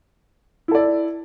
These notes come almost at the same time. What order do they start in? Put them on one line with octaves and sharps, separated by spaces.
E4 A4 D5